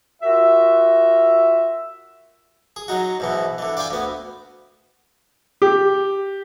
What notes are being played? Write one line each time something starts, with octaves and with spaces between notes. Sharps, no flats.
F4 F#4 A#4 E5
G#4
F#3 D#4 F#4
G#2 B2 E3
D3 E3
D5 F5 G5 G#5
D2 B3
G4